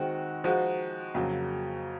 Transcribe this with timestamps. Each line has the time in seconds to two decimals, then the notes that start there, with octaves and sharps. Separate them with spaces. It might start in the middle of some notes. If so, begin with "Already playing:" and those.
Already playing: D#3 G#3 C4 F#4
0.44 F3 G#3 D#4 F#4
1.14 F2 C#3 F#3 A#3